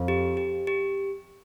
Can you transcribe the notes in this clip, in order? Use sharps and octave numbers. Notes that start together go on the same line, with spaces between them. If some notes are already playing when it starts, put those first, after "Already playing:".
Already playing: F2
G4
G4
G4